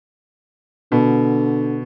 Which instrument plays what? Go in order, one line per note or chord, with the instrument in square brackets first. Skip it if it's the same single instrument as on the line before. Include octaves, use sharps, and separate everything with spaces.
[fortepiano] B2 [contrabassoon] D3